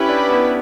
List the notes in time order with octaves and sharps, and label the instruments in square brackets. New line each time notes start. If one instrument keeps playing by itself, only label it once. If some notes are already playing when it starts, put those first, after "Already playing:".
Already playing: [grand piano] C#4 [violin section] E4 G4 B4
[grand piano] D4
B3